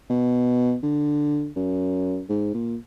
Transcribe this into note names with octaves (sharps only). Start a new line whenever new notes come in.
B2
D3
F#2
G#2
A#2